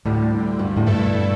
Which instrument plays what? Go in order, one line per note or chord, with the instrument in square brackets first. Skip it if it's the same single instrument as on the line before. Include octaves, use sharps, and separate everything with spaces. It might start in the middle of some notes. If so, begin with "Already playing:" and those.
[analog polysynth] D2 D3 G3 [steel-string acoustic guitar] A2
[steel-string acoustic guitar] G2
A2
[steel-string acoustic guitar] G2 [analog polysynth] B2 A3 E4 A4